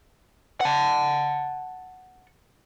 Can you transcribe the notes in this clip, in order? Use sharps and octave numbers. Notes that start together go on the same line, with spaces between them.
F#5 A5